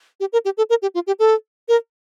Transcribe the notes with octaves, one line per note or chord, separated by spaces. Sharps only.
G4
A#4
G4
A4
A#4
G4
F4
G4
A4
A#4